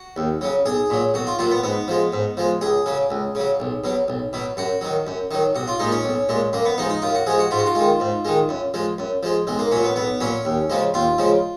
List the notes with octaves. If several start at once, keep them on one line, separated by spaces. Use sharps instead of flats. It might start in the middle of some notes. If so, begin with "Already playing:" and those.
Already playing: F#4
D#2
C#3 F#3
B1 G#4
A#2 F#3
B1 F#4
F4
A#2 F#3 F4
B3
G#2 B3
F3 G#3
G#2
F3 G#3
C#2 G#4
C#3 F#3
C#2
C#3 F#3
B1
B2 F#3
B1
B2 F#3
F#2 F#4
D#3 F#3
F#2
D#3 F#3
B1 F#4
F4
A#2 G#3 D#4
C#4
B1
A#2 G#3
F#2 A#3
B3
F3 G#3 D#4
D#4
F#2 F4
F#4
F3 G#3 G#4
F#4
G#2 F4
F#4
F4
D#3 G#3
G#2
D#3 G#3
F#2
F3 G#3
F#2
F3 G#3
B1 G#3
A#3
A#2 F#3 C#4
B3
B1 B3
A#2 F#3 C#4
D#2
C#3 F3 G#3
D#2 F4
C#3 F3 G#3